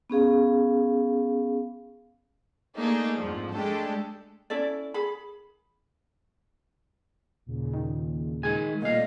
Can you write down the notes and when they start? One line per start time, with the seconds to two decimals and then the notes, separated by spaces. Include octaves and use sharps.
0.10 B3 C#4 G#4 F5
2.78 A3 A#3 D4 D#4 G#4
3.18 F2 G#2 F3
3.52 G#3 A3 D4 G4 A4
4.50 C#4 E4 A4 D5
4.94 G#4 B5
7.46 D#2 A#2 C#3
7.74 D#3
8.43 D#3 G#3 G#5
8.82 C2 A#2 A3 A4 D5 D#5 F5